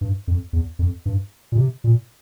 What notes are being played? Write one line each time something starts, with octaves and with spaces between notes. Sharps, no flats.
G2
F2
E2
F2
G2
A#2
C3
A#2